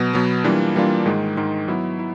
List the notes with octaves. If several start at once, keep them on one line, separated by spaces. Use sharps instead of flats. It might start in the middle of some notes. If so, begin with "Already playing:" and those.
Already playing: B2 F#3 B3
B2 F#3 B3
E3 G3 A#3 D4 F4
E3 G3 A#3 D4 F4
G#2 D#3 G#3
G#2 D#3 G#3
F#3 B3 E4
E4